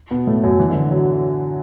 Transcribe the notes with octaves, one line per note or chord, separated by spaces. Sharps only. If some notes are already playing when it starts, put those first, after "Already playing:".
B2 B3
A2 A3
F#2 F#3
E3
D3
E3
F#3